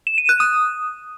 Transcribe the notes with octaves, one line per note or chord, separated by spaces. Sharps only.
E7
D#7
F#6
D#6